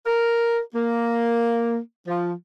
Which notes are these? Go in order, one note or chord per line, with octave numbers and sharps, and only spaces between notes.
A#4
A#3
F3